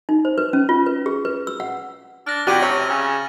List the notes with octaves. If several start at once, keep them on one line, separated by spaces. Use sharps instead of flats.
D#4
C5
B4
C#4
F4
B4
G#4
B4
E6
F#5
D4 F6 A6 A#6
F2 F#4 G4 D5 G#6 D#7 F#7
C3 C#5
C#3